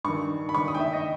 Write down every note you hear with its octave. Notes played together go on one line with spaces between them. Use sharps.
G2 D#3 C#6
B5
G2 D#3 C#6
D#6
G5
E5
D#5